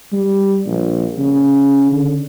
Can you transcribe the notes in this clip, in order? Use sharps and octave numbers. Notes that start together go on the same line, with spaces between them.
G3
A#1
C#3
D3